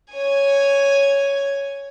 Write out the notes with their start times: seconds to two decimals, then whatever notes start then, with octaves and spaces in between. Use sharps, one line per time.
0.12 C#5 G#5